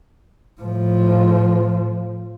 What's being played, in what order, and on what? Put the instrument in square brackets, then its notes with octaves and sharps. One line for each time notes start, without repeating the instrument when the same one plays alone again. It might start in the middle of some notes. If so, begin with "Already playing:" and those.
[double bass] A2 F3